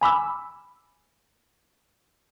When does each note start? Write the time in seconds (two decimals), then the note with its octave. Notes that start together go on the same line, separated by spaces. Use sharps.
0.01 G#5 B5 D6 E6